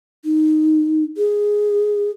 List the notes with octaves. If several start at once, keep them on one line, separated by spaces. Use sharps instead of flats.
D#4
G#4